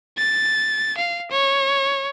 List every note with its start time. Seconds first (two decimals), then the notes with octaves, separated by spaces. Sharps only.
0.18 A6
0.97 F5
1.31 C#5